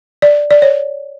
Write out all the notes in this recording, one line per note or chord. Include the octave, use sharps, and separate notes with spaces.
D5
D5
C#5